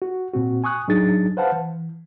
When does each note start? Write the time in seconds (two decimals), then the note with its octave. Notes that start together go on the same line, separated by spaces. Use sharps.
0.02 F#4
0.33 A#2 C4 F#4
0.64 G#5 C#6 D#6 F#6
0.87 A2 F#3 D4 D#4 G#4 A6
1.37 B4 C5 F5 F#5 A5
1.52 E3